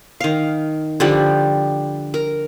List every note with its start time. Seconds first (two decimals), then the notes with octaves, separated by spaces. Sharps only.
0.20 D#3 F5
1.00 D3 F3 G3 G4
2.14 A#4